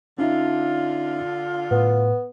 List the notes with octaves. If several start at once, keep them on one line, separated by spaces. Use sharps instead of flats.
D3 C#4 D#4 F4 E5
A2 B3